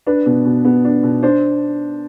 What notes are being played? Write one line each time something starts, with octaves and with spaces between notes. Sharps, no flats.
D4 B4
B2
B2
B3
D4
B2
D4 C5